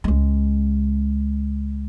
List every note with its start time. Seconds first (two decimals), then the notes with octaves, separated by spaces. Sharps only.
0.04 C#2 G#3